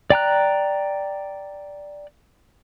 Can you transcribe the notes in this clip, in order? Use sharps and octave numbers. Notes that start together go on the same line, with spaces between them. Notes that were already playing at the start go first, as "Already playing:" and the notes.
D5 G5 A#5 F#6